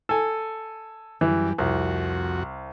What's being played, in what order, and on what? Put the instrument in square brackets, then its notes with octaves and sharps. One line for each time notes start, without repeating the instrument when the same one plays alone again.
[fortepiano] A4 G#5
[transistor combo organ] F#2 G3 [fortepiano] E3
[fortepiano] C2 [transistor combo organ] F2 F#4